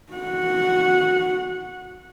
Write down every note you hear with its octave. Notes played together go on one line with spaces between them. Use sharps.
F#4 F#5